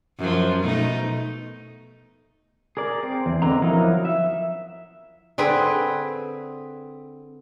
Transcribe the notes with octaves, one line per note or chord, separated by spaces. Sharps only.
F#2 F3
B2 A3 D#4
G#4 A#4 D5
C4
E2
D3 C4 D#5 A#5
F3 F#3 D#4 E4 A#4
E5
D3 C4 G#4 B4